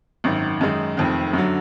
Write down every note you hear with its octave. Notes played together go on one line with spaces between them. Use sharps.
G#1 F#2 D#3
F#2 D#3 G#3 D#4
F1 F2 D#3
F#2 D3 F#3